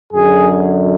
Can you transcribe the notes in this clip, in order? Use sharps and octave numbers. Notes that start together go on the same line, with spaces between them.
F#2 D3 F#3 G#4